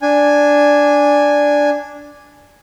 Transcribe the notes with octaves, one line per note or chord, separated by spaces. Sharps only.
D4 G#5